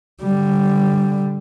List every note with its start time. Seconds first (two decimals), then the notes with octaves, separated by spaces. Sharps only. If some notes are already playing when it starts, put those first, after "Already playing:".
0.22 D3 G3